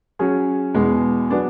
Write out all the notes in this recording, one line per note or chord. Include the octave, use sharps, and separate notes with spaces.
F#3 C#4 G#4
E2 B2 G#3
F#3 B3 D4